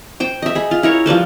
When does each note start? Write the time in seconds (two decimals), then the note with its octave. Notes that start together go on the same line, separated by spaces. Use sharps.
0.20 C5 G5
0.42 D#5 E5
0.55 G#4 B5
0.71 F4
0.83 E4 A#4 C#5
1.06 F3 G3 B4 C5